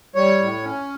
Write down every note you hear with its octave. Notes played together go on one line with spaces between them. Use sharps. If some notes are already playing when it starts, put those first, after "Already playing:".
G3 C#5
A2
C#4